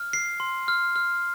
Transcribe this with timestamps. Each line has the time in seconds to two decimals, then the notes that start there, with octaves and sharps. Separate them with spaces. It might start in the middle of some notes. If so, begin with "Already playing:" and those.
Already playing: F6
0.13 C7
0.40 C6
0.68 F6
0.96 F6